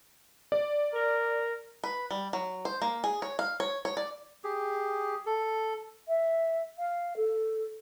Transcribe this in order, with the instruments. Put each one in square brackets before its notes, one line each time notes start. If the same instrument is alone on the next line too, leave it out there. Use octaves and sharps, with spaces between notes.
[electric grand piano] D5
[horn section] A#4
[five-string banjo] B4
G3
F#3
C5
A#3
G#4
C#5
F5
C#5
C#5
D5
[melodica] G4 G#4
A4
[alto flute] E5
F5
A4